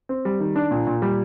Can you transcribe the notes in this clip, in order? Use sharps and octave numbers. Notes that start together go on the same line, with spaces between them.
C4
G3
D#3
D4
A#2
A#2
G3